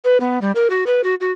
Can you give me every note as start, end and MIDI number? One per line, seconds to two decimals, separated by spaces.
0.05 0.18 71
0.20 0.39 59
0.41 0.52 55
0.55 0.68 70
0.70 0.84 66
0.87 1.01 71
1.04 1.15 66
1.21 1.32 66